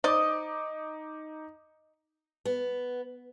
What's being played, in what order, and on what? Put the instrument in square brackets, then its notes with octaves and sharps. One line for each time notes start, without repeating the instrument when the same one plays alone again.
[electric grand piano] D#4 D6 [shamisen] C5 D5 [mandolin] D#5
[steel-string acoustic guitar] B3